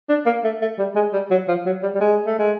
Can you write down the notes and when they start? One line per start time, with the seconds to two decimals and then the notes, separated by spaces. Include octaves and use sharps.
0.09 D4
0.26 A#3
0.44 A3
0.62 A3
0.79 G3
0.96 G#3
1.13 G3
1.31 F#3
1.48 F3
1.66 F#3
1.83 G3
1.95 G3
2.01 G#3
2.26 A3
2.39 G#3